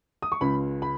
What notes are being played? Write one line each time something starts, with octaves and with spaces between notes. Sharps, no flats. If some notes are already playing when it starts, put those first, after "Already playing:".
D#6
C#6
C#2 C#3 B5
B5